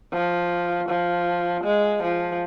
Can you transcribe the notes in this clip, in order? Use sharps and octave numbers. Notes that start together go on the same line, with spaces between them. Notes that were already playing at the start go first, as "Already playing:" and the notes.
F3
F3
G#3
F3